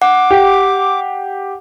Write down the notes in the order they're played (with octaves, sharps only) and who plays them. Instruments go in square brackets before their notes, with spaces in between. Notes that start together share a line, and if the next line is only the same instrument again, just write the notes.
[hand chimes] F#5 [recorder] D6
[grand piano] G4